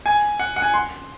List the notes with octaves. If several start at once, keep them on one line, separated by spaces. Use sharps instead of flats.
G#5
F#5
F#5
G#5
C6